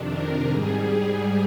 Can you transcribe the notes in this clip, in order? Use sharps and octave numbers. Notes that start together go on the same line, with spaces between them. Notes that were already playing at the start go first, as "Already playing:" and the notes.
Already playing: F2 C3 D#3 D4
A#4
G#2 G3 G#4
G#4